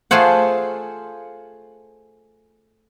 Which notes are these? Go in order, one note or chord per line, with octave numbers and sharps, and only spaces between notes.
A3 F4 G#4 C5 F#5